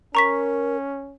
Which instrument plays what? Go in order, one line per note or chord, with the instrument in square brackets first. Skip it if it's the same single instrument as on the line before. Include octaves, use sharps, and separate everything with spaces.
[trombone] C#4 [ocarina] A#4 [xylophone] A#5 C#6 B6